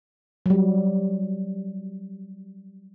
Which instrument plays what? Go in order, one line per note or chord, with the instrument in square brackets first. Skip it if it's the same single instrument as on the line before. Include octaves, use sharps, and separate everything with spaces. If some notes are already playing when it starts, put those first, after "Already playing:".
[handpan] F#3 G3